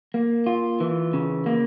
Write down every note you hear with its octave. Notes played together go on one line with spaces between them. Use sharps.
A#3
F4
E3
C#3
A#3